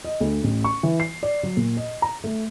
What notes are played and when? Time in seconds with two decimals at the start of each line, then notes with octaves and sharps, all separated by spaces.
0.04 D#5
0.20 D2
0.44 A1
0.64 C#6
0.83 E3
1.00 C7
1.23 D5
1.43 F#3
1.57 A#2
1.77 D#5
2.02 A#5
2.24 A3